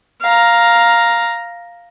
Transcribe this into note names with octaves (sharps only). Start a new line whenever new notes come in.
F5 A#5